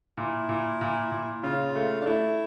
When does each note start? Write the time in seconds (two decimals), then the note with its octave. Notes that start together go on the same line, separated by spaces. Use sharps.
0.17 A#2 E4
0.49 A#2
0.81 A#2
1.12 A#2
1.43 C#3 F4
1.76 A3
2.01 D4
2.06 A3 E4